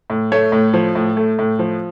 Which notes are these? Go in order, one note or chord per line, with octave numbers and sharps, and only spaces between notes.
A2
A3 C#5
A2
F3
A2
A3
A2
F3